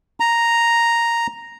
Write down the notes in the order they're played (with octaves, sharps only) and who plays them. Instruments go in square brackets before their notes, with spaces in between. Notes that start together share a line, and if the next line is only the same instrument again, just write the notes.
[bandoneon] A#5